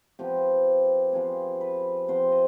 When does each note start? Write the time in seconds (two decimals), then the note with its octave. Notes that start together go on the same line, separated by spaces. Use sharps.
0.19 C3 F3 B3 G4
1.13 C3 F3 B3 G#4
1.61 B4
2.08 C3 F3 B3 C5
2.32 D#5